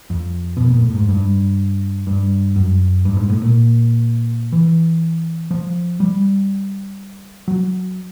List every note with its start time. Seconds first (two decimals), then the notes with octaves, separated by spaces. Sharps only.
0.10 F2
0.57 B2
0.70 A#2
0.82 A2
0.95 G#2
1.09 G2
2.07 G2
2.56 F#2
3.05 G2
3.17 G#2
3.30 A2
3.41 A#2
4.52 E3
5.51 F3
6.00 G3
7.48 F#3